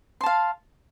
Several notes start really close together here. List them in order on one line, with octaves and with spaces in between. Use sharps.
C6 A5 F5